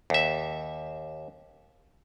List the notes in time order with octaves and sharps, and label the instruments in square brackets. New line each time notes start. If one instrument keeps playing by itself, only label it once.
[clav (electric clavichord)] D#2 E5